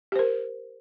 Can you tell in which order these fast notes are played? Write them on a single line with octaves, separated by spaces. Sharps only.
G4 C5 A#4